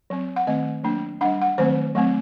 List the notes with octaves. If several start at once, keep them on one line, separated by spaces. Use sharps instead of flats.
F#3 C4
F#5
D#3 A3 C4 D#5
F#3 A#3 D4
G3 D4 F#5
F#5
D#3 F#3 A3 C4 C5
F#3 A3 C4